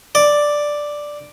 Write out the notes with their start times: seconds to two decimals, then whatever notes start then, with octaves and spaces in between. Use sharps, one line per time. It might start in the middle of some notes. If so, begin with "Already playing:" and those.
0.15 D5